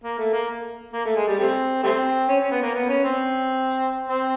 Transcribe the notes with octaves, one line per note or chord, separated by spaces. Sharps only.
A#3
A3
A#3
A#3
A3
G#3
G3
G3 A3 C4
G3 A3 C4
C#4
C#4
B3
A#3
B3
C#4
C4
C4